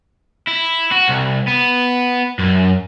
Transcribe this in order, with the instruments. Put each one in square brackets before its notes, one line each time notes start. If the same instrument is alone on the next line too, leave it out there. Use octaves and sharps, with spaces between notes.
[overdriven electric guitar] E4
F#4
C2
B3
F#2